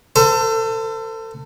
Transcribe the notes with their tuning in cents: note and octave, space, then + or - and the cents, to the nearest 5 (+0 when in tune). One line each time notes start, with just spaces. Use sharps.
A4 +30 C5 -40